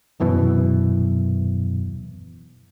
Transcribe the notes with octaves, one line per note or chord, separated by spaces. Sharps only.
D#1 F#2 B2 E3